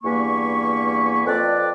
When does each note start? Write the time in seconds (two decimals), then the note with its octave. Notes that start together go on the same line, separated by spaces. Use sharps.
0.03 E2 G2 A#3 G#5 B5 C#6
1.26 F2 C4 A4 B4 D5